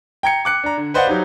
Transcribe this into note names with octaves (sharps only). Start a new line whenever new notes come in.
G5 A#5 G#6 C#7
D6 F#6 C#7
D4 A#5
D3
B4 C5 D5 D#5 F5 F#5
F#3 D#4 G4